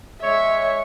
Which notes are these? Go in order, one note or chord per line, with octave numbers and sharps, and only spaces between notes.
G#3 C#5 E5